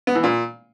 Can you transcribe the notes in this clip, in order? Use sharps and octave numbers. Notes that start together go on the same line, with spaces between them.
B3
E3
A#2